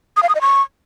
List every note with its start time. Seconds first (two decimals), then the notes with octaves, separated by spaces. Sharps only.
0.17 D#6
0.23 F5
0.29 D#6
0.35 D#5
0.41 C#6